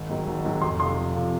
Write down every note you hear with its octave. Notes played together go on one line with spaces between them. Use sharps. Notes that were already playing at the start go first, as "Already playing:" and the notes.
Already playing: G#1
G#2 D#3 F#3
G#1
G#2 D#3 F#3
F1 C6
F2 C3 F3 C6
F1
C3 F3